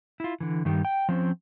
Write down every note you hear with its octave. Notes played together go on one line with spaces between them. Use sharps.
E4 F4
D3 E3
G2 D#3 G3
G5
F3 C4 C#4